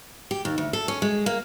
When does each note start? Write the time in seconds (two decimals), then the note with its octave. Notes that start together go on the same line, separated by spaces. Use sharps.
0.31 G4
0.45 D#2
0.58 D2
0.73 A4
0.88 C#4
1.02 G#3
1.26 A#3